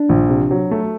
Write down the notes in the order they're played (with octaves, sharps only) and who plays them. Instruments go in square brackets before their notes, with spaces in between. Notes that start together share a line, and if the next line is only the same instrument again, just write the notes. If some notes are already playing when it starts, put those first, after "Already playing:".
Already playing: [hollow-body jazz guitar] D4
[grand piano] A#1
C3
F#3
A3